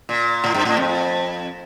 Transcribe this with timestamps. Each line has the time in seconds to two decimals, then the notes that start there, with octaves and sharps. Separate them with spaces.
0.09 A#2
0.44 A2
0.54 G2
0.65 A2
0.77 F2